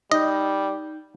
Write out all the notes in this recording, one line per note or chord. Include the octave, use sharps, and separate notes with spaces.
G3 D#4 D#5 G6